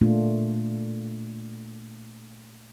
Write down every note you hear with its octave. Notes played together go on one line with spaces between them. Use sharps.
A#2 A3 A#3 D4 F4